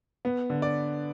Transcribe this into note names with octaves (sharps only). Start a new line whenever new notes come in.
B3
D3
D5